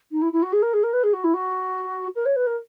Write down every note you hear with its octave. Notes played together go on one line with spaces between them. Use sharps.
D#4
E4
E4
F#4
G#4
A#4
G#4
A#4
B4
G#4
F#4
E4
F#4
A#4
C#5
B4
A#4